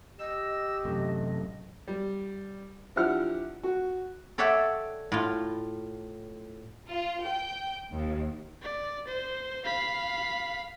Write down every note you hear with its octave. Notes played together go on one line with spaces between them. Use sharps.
G4 D#5 E6
A1 F#2 C3 A3
G3
F3 D4 E4 G4 F#5 F6
F#4
A4 C#5 D5 E5 F#5 G5
A2 F4
F4
G5
D#2
D5
C5
F5 B5